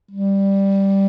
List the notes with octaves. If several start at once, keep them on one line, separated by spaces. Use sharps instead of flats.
G3